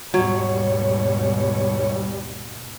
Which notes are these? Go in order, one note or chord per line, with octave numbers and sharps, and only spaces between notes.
D#2 G#2 B2 F#3 G3 C#5